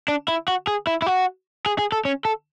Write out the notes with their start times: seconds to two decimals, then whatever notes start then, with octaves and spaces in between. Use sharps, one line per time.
0.08 D4
0.28 E4
0.48 F#4
0.67 G#4
0.87 E4
1.02 E4
1.06 F#4
1.66 G#4
1.79 G#4
1.92 A4
2.05 C#4
2.25 A4